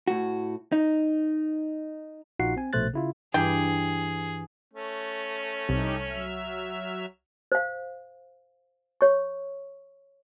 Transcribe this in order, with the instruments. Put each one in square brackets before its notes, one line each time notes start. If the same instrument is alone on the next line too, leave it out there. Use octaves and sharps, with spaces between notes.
[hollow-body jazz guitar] A2 F#4
D#4
[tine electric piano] A#1 D#4 F4 F#4 F#5 C7
C4 G#5
A#1 B2 A3 C5 F#6 A6
C#3 E4 F4
[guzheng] G2 [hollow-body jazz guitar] E3 [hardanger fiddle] G#4 [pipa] G5
[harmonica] A3 C#4
[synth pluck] C2 [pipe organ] D#4 G4
[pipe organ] F#3 E5 F6
[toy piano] C5 F5
C#5 C#6